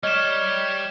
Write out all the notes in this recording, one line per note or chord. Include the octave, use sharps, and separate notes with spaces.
G3 C#5 D#5 F6 E7